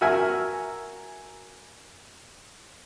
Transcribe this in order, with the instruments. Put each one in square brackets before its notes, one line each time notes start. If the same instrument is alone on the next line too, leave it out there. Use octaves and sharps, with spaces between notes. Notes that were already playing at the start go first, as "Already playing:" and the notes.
[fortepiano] F#4 A#4 E5 G#5 A#5